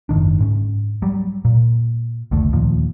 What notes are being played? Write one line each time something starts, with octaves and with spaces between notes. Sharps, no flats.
F#1 G#2 D#3 D4
G#2 C#4
F#3 G3
A#2
F1 C#2 D3 A3
D#2 A#2 F3